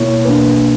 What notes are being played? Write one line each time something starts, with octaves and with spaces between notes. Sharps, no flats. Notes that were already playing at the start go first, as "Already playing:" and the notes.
Already playing: B2 A#3 E4 C#5
E2 B2 A#3 D4 B4